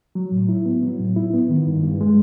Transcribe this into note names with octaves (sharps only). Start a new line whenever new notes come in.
F#3
A2
E4
B3
F#3
A2
E4
B3
D#3
G2
G2
G#3